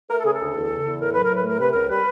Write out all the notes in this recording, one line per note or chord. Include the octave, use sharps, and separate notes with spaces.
A3 A#4
A4
C#3 G#4
A4
D2
E2
C#3
E2
A2 A#4
F#3 B4
A#4
A2
B4
A3 A#4
C3 B4
C#2 A#4
G3 B4